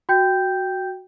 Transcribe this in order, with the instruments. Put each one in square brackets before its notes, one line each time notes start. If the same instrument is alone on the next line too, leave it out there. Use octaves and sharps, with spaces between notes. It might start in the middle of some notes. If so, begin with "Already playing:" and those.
[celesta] F#4 G5 G6